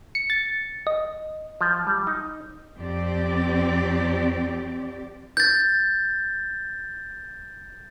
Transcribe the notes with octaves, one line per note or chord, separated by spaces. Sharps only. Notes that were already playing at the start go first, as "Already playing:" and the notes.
C#7
A6
D#5
F3
G3
D#4
F2 C4 G4 D5
G6 A6